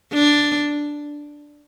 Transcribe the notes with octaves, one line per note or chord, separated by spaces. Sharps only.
D4